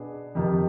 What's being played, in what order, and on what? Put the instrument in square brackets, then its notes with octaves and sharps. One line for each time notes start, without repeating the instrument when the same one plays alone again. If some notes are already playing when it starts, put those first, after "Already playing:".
Already playing: [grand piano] B2 B3 D4 G#4
F2 C3 D#3